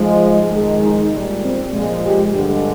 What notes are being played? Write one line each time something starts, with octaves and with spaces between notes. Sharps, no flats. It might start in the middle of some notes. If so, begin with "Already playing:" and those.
Already playing: G#2 F3 G#3
F2 D#3 G#3
D#4
A#2 G3
C4
A#2 F3 G#3
G4
G2 D3 G#3